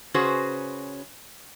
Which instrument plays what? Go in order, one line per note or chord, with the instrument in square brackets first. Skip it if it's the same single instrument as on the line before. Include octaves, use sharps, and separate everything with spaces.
[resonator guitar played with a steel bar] C#3 C#4 F#4 G#4 B4 C5